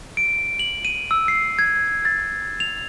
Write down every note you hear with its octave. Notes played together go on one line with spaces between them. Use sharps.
D7
F#7
D#7
E6
C7
G#6
A6
F7